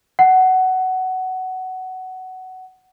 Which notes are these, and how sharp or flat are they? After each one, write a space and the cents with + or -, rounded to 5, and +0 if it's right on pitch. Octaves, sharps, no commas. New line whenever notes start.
F#5 +15